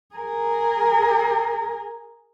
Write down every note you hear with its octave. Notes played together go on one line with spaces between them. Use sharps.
G#4 A#4